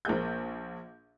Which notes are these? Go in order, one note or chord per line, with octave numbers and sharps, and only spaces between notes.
A#1 A#3 G#4 G6